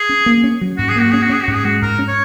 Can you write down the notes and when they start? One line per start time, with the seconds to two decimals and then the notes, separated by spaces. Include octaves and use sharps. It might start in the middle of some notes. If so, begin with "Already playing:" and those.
Already playing: G#4
0.09 C#4
0.26 A#3
0.44 C#4
0.61 F#3
0.78 G#2 F#4
0.89 G#4
0.96 A#3 F#4
1.11 C#4 G#4
1.22 F#4
1.30 C#4 G#4
1.43 G#2 F#4
1.54 G#4
1.64 G#3 F#4
1.82 G#2 A#4
1.99 C#4
2.08 C#5